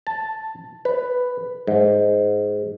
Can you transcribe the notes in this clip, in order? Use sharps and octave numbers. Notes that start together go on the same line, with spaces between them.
A5
B4
G#2